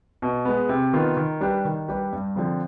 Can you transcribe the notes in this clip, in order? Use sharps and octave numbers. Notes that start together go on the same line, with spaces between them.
B2
G#3 B3
C3
D#3 B3 F4
D#3
G3 D4 G4 B4
D#3
G3 D4 G4 B4
G2
D3 F3 C4